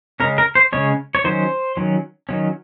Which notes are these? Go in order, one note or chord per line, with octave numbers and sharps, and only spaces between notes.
C#3 G#3 C#4 A#4
A#4
C5
C#3 G#3 C#4 C#5
C#5
D#3 F#3 C#4 C5
D#3 F#3 C#4
D#3 F#3 C#4